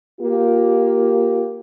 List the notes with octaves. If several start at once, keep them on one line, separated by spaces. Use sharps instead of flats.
A#3 F4 G4